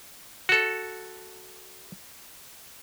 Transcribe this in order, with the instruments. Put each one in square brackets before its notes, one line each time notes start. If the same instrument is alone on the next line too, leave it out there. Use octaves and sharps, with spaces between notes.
[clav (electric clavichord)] F#4 A4